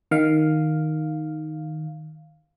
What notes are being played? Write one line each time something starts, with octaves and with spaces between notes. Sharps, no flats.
D#3 F5